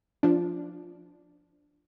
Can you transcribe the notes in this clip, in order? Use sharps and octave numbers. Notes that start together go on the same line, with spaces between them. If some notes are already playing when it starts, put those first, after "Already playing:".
F3 D4